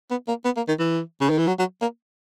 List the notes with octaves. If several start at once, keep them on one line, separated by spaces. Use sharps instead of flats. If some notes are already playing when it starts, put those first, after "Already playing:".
B3
A#3
B3
A#3
D#3
E3
C#3
D#3
E3
F#3
F#3
A#3